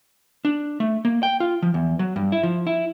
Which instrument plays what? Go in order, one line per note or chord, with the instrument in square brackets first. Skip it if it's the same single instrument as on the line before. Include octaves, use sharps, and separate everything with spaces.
[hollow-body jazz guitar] D4
A3
A#3
G5
F4
F3
E2
F#3
G2
E4
F3
E4